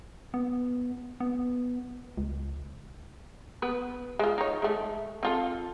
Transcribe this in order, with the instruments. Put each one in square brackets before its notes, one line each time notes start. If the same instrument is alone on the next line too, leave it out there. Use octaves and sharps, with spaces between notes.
[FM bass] B3
B3
C#2
[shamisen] B3 B4
G#3 F4
D#4 C#5
G#3 A3
C4 F4 A4